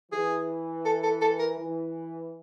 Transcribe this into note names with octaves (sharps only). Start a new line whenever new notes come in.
E3 G#4
A4
A4
A4
A#4
E3